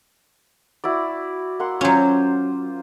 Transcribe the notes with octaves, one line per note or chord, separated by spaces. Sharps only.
E4 F#4 D5
A#3 F#5 C6
F#3 C#4 F4 C5